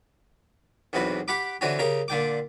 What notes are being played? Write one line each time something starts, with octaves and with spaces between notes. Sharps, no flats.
B1 E2 C3 F#4 B4
G4 F#5 B5 D6
D3 E3 C4 C#4 F#4 G4
C#3 G4 A#4
A#2 D3 G5 D6